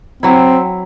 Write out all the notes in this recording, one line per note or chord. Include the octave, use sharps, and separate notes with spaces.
F#3 C4 E4